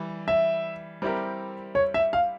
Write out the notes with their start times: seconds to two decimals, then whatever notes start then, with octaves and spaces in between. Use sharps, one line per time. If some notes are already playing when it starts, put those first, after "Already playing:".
Already playing: E3 G3
0.28 E5
1.02 G3 C4 E4 G4 A#4
1.75 C#5
1.94 E5
2.13 F5